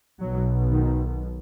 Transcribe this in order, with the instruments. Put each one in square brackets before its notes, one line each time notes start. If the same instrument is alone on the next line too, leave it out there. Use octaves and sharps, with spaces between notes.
[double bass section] B1 B2 F#3
D#3